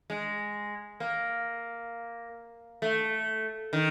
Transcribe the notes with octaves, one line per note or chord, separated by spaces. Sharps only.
G#3
A#3
A3
D#3